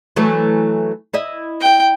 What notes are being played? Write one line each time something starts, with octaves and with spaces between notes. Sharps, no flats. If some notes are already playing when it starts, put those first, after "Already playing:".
E3 F#3 A3
E4 D#5 E5
G5